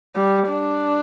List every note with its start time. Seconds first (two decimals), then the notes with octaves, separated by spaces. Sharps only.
0.15 G3
0.49 D4